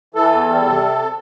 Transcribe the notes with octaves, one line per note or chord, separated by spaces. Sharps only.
E3 A4
E2
G3
C3